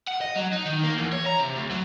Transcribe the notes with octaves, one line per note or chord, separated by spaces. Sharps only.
F#5
D#5
F#3
D#4
D#3
A#3
E2
C#5
A#5
C3
D2
F#3